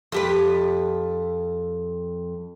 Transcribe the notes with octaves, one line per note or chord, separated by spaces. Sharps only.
F2 G4 B4